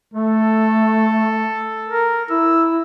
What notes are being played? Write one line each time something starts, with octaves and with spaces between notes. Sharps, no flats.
A3 A4
A#4
E4 E6